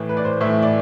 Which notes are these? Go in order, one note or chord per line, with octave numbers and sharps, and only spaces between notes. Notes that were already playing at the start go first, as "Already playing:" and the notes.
Already playing: A2 E3
B4
D5
C5
A2 E3 E5
D5